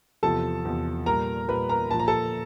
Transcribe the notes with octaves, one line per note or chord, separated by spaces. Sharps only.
E2 C3 F3 A4 A5
E2 C3 F3
A#2 G3 A#4 A#5
A#2 G3 B4 B5
A#4 A#5
A#2 F3 A5
A#5
A4 A5